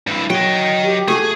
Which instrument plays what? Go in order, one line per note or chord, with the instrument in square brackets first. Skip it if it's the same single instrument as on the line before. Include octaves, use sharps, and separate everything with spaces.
[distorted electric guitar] G2 E4
[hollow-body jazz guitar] F#3 [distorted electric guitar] D#5 G5
[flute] G4
[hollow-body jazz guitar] A3 F#4 A4 [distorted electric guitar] G#4